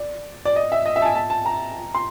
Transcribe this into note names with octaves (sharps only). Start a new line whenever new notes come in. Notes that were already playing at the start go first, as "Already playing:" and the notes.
Already playing: D5
D5
D#5
E5
D#5
E5
A5
G#5
A5
A5
A#5
C6